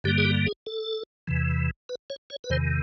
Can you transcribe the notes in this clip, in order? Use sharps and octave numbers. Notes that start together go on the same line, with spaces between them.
G2 D3 G3 A#3 G4
G#4
G4
G#4
A4
E2 C3 E3
B4
C#5
C#5
B4
E2 C3 D#3 C5